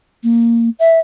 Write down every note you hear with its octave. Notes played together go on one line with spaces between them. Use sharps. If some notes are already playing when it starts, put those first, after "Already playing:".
A#3
E5